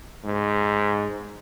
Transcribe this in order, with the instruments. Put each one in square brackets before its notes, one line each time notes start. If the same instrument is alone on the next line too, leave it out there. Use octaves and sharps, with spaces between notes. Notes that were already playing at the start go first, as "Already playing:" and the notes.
[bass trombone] G#2